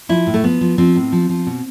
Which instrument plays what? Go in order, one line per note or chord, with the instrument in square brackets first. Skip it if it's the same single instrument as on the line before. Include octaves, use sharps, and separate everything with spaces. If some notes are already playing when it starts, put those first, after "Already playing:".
[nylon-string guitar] F3 E4
A2
A3
F3 B3
F3
F3 C4
A2
F3
F3
B2